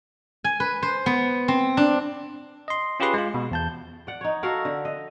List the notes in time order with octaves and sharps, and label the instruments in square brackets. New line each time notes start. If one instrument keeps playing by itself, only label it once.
[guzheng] G#5
B4
C5
B3
C4
D4
[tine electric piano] D#5 C6
C#4 F4 G4 G#4 B4 C6
G#3 F4
B2
E2 A5 G6
[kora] D5 F#5
D#4 C#5
F#4 A4 A#4 F5
D3
D#5